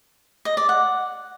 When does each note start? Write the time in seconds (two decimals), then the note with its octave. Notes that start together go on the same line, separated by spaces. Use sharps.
0.45 D#5
0.57 D5
0.69 F#5